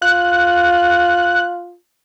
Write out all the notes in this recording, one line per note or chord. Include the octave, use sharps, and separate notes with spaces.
F4 F#6